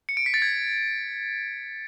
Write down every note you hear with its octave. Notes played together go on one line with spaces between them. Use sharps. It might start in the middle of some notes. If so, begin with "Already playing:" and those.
C#7
D7
B6
A6
G#6